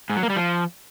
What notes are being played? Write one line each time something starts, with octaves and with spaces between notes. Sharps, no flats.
G#2
F#3
A#3
G3
F3